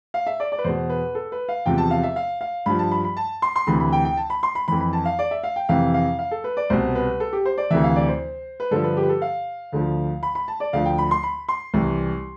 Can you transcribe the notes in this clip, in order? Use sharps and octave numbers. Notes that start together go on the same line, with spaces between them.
F5
E5
D5
D5
B4
E2 B2 C5
B4
A4
B4
F5
E2 C3 F3 G5
A5
F5
E5
F5
F5
G2 F3 B5
A5
B5
B5
A5
C6
C6
D2 C3 E3 B5
B5
G5
G5
A5
B5
C6
B5
F2 E3 B5
B5
A5
F5
D5
E5
F5
G5
F2 C3 E3 F5
F5
F5
A4
B4
D5
C2 B2 C5
B4
A4
G4
C5
D5
D2 C3 E3 E5
F5
D5
C5
B4
G2 D3 F3 A4
B4
G4
B4
A4
F5
D2 D3 F3
B5
B5
A5
D5
D2 D3 F3 F5
G5
B5
C6
B5
C6
C2 C3 E3